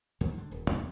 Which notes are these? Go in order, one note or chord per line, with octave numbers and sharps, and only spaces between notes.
D2 G#2 D#3
D3
D#1
E2 C3 F#3 A#3